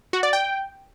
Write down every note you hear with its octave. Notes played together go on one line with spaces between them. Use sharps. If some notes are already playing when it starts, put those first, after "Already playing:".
F#4
D5
G5